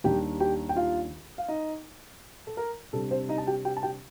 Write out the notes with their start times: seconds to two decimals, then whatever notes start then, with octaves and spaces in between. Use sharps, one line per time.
0.04 D#2 D#3 G3 D4 G4 G5
0.40 G4 G5
0.69 G5
0.76 F4 F5
1.38 F5
1.48 D#4 D#5
2.47 A4
2.57 A#4
2.93 C3 G3 D4 A4
3.11 C4 C5
3.29 D#4 D#5
3.38 A5
3.47 G4 G5
3.65 G4 G5
3.77 A5
3.83 G4 G5